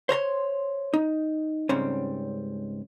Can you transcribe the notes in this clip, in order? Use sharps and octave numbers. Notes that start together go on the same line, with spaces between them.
C5 C#5 A#5 C6
D#4
C#2 G#2 G3 C4 C#4